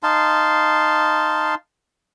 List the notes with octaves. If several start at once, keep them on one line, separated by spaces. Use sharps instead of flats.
D#4 F5 A5 C6